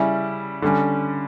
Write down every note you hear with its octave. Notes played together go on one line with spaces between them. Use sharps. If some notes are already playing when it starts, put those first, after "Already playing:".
Already playing: C#3 G3 C#4 E4
D3 G3 C#4